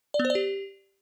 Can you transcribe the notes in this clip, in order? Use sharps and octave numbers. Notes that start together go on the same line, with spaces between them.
D5
B3
C5
D5
G4